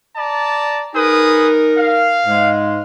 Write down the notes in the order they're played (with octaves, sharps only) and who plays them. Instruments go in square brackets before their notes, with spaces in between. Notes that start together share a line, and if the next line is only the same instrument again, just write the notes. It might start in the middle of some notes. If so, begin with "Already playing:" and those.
[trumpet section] D5 A5 A#5
[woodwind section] D#4 A#4 [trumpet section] G#4 B4 D#6
[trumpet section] F5
[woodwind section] G#2 G#3